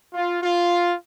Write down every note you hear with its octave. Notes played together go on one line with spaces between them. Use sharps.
F4
F4